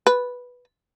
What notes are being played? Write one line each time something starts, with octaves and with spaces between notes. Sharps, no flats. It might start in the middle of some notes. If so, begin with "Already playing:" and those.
B4